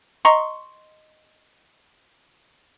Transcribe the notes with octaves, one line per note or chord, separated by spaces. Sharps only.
D#5 A#5 C6 C#6